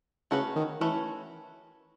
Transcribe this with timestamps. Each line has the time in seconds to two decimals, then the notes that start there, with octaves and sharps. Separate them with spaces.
0.31 C#3 A3 C#4 F#4 B4
0.56 D#3
0.81 E3 A3 C#4 F#4 B4